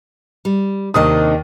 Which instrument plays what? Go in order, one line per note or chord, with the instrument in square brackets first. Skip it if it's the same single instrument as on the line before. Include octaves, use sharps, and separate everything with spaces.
[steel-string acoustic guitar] G3
[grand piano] D#2 D#3 D#6 [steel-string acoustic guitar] C3 D4 D#5